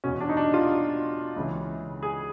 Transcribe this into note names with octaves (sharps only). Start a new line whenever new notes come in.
E2 B2 C#4
D4
D#4
D4
F4
C#2 C#3 E3
G#4